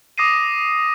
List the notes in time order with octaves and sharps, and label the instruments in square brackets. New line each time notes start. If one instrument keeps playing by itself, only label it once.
[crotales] D6 D#6 A#6 C7 D#7